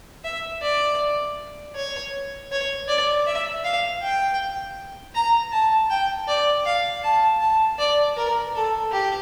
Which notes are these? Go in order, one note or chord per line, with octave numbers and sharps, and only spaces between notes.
E5
D5
C#5
C#5
D5
E5
F5
G5
A#5
A5
G5
D5
F5
A5
A5
D5
A#4
A4
G4